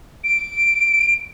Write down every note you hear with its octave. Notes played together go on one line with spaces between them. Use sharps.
D7